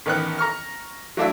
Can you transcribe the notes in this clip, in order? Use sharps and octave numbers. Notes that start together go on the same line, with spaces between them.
A1 D#3 B3 F#6
A#5 C#6 F6
F#3 A3 D4 E4 E5